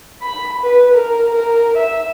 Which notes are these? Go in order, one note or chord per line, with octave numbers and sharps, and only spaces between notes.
B5
B4
A#4
A#4
E5